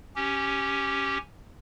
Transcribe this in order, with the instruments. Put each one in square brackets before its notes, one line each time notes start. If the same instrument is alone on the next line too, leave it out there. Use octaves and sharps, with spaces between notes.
[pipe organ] C#4 G4